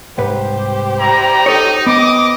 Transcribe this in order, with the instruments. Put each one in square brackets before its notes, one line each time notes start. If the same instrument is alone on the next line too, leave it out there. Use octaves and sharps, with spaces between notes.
[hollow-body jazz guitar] C2 G#2 B4 [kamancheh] G4 C5
[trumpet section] G3 E4 A#5
[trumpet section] D#4 [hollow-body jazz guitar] A4 C#5
[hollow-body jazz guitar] B3 [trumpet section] D#5 D6